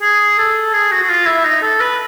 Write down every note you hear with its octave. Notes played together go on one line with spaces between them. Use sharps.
G#4
A4
G#4
F#4
F#4
F4
E4
D#4
A4
B4